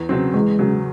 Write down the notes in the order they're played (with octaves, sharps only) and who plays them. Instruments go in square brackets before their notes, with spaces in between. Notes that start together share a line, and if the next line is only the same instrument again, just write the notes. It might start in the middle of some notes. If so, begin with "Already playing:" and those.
Already playing: [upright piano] E2
C#3 F#3 C4
[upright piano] E2 [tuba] G#3
[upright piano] C#3 F#3